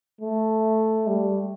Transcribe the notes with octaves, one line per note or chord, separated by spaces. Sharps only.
A3
G3